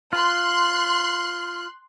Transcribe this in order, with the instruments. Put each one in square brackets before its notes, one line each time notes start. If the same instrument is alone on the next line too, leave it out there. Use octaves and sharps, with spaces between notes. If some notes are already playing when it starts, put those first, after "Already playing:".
[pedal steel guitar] F4 [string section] C6 F#6